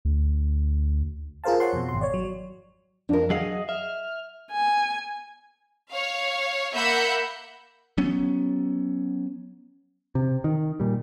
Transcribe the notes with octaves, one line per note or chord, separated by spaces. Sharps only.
D2
F4 G#4 A#4 C5 F5 A5
C#5 F#5 C6
F2 B2
G#1 C6
C#5 D5
F#3
F2 D4 A#4
F#3 G#4 D#5 F5 F#5
E5 F6
G#5
C#5 F5
A#3 E5 F#5 B5 G6 C#7
F#3 B3 C#4
C3
D#3
A#2 G3